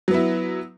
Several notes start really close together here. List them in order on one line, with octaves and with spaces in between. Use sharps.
F#3 B3 E4